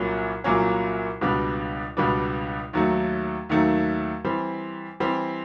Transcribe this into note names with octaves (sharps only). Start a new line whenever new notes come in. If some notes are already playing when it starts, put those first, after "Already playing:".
Already playing: C2 A#2 F#3 A#3 C#4
C2 A#2 F#3 A#3 C#4
C#2 B2 G3 B3 D4
C#2 B2 G3 B3 D4
D#2 D#3 F#3 A3
D#2 D#3 F#3 A3
E3 G3 C4
E3 G3 C4